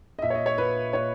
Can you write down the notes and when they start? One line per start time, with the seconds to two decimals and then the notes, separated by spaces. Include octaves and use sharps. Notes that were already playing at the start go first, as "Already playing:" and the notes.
0.19 D#5
0.22 A#2 E5
0.30 C#5
0.35 D#5
0.46 C#5
0.58 A#2 B4
0.93 A#2 C#5